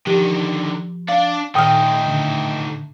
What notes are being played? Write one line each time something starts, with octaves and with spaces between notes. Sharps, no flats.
D3 D#3 F3 G4
D4 D5 F5
A#2 D#3 A3 D#4 G5 D#6 F6
A2 D3